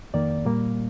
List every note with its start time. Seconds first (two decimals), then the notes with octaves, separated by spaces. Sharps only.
0.14 F2 D#3 A#3 D5
0.45 A#2 G3 A#3